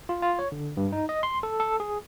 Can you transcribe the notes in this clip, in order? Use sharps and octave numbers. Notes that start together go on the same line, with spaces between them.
F4
F4
C#5
D3
G2
D#4
D#5
C6
A4
A4
G#4